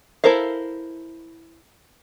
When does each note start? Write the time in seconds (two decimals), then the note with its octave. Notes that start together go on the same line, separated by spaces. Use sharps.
0.24 E4 A4 A#4 C5 F5